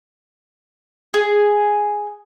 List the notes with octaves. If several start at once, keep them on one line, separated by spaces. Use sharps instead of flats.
G#4